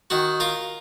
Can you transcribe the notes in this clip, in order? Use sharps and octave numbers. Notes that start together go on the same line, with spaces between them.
D#3 F#4
F4 A#4